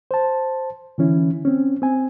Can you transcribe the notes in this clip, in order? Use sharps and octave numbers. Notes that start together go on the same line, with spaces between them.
C5 A5
D3 E3 C#4 E4
C4 C#4
C4 G#5